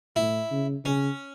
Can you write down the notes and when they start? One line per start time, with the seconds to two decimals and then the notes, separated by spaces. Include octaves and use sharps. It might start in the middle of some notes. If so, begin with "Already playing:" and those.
0.16 A2 E4
0.51 C#3
0.85 C#3 C#4